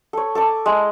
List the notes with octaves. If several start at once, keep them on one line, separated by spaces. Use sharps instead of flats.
A4 C#5
A4 C#6 D6
G#3 E4